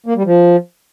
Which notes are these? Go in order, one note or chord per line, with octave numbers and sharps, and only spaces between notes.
A#3
G3
F3